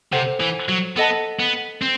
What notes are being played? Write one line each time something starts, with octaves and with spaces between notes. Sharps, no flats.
C3 A4 C5 F#5
E3
F#3
B3 A4 D#5 F#5 A5
B3
C4